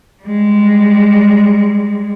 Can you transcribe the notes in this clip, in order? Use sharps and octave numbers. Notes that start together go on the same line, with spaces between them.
G3 G#3